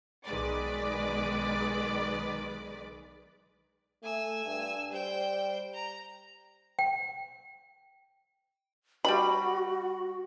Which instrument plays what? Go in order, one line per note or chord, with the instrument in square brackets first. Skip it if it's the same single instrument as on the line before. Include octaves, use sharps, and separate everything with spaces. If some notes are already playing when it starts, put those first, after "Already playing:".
[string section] B1 D#3 G#3 B4 D5 D6
[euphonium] A3 [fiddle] G#5 E6
[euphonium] G2
[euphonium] G3 [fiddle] C5 G5
[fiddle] A#5
[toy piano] G5
[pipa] G3 B5 [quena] F#4